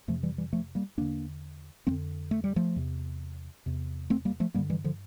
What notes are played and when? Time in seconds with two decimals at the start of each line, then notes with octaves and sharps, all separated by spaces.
0.08 F2 C3 F3 A3
0.23 E3 G3
0.38 E3 G3
0.53 F3 A3
0.75 G3 A#3
0.97 E2 D3 A#3 D4
1.87 F2 D3 A3 C4
2.31 A3
2.44 G3
2.56 F3 A3
2.76 E2 C3
3.66 E2 C3
4.10 A3 C4
4.25 G3 A#3
4.40 F3 A3
4.54 G2 G3 A#3
4.58 D3
4.70 E3 G3
4.84 D3 F3